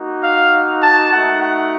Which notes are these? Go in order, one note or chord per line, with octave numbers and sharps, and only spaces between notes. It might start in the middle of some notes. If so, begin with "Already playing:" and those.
Already playing: A#3 D#4 F#4
F5
A5
A3 D#4 F#4 F#5
F#5